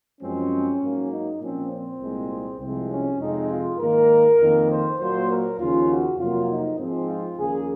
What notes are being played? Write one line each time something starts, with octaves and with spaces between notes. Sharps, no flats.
F#2 F3 G#3 C4 C#4
G#2 F#3 A#3
D#4
A#2 F3 C4 C#4
C4
C2 A#2 G#3
C2 C3 F3 G#3 C4
C#4
F2 C3 F3 G#3 C4 D#4
F4
G#2 D#3 A#3 A#4
F2 D#3 A#3
C5
A#2 F#3 A#3 C5
A#4
D#2 C#3 F3 F4
F#4
F2 C3 F#3 A#3 F4
D#4
G#2 F3 G#3 C4
F4
D#2 C#3 F3 A#3 G#4